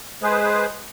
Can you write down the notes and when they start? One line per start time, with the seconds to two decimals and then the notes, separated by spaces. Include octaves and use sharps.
0.22 G#3 G#4 B4 C5